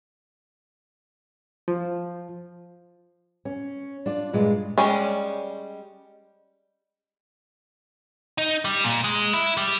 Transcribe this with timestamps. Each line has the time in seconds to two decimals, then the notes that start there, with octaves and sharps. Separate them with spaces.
1.68 F3
3.45 C#4
4.06 D4 F4 D5
4.33 G2 A#2 G#3 F4
4.78 G3 G#3 C#4
8.38 D#4
8.65 G3
8.84 A#2
9.04 G#3
9.33 E4
9.57 G3